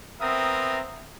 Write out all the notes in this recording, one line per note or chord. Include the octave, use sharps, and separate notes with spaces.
B3 C4 A#4 E5 A#5 D#6